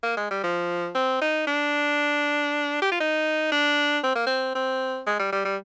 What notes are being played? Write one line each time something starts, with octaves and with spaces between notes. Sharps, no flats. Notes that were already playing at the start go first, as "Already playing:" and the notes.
A#3
G#3
G3
F3
C4
D#4
D4
G4
F4
D#4
D4
C4
A#3
C4
C4
G#3
G3
G3
G3